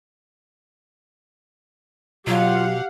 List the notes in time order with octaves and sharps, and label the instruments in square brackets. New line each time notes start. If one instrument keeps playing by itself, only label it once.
[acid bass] B2 [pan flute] F#3 [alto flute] F4 [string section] G4 F5 F#5